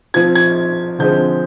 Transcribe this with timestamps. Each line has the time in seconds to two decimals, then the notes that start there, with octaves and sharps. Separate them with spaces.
0.14 F3 C4 F4 G#6
0.35 G#6
0.99 D3 F3 G#3 C4 G6